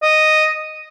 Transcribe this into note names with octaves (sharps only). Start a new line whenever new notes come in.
D#5